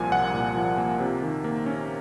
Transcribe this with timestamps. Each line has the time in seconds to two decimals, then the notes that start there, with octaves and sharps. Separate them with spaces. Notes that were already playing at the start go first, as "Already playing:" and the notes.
Already playing: C2 A#2 F3 A#3 G#5
0.11 C2 F#5
0.34 A#2
0.56 F3
0.78 A#3
1.00 C3
1.22 D#3
1.44 A#3
1.66 C#4